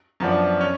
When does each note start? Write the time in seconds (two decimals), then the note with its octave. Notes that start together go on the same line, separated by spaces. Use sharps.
0.20 F#2 F3 B3 D4
0.61 C#4